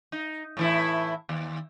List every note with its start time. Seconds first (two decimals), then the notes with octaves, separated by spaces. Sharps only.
0.12 D#4
0.57 A2 E3 E4
1.29 D#2